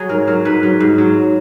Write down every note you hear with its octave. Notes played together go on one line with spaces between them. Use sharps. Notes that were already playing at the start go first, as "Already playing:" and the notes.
Already playing: F#3 F#4 G#4
G#2 A#4
F#3 A#4
G#2 B4
F#3
G#2
F#3